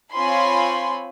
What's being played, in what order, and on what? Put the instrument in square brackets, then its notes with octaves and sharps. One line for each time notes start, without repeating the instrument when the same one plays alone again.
[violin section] C4 F4 C#5 G#5 B5 C6